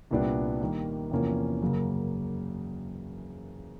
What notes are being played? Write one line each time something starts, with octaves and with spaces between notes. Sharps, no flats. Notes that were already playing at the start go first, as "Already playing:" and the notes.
C2 A#2 G3 B3 D4
D#3 G3 A#3
E2 C3 F3 A#3 C#4
F#2 C#3 F#3 A#3